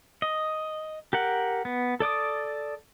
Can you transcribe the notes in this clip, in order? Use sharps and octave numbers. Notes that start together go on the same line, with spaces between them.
D#5
G4 A#4 F#5
B3
A4 D5 D6 D#6